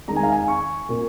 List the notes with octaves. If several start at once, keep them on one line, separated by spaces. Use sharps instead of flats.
D#3 G#3 A#5
G#5
F5
G#5
C#6
A#2 A#3